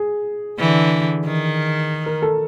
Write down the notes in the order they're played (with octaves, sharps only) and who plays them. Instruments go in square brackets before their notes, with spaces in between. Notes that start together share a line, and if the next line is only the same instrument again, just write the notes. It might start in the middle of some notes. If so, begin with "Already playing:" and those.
Already playing: [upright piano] G#4
[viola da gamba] D3 E3
D#3
[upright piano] A#4
A4